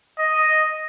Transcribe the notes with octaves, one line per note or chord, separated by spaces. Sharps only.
D#5